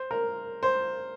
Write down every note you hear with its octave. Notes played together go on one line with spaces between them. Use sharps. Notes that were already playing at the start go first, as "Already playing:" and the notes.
Already playing: C5
A#4
C5